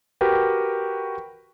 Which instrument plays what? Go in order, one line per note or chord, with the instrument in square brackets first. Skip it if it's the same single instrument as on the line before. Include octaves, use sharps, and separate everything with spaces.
[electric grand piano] F#4 G4 A#4 B4 G5